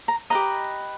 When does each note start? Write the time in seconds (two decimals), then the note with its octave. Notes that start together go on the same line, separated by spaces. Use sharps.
0.08 A#5
0.30 G4 B4 D#5 A#5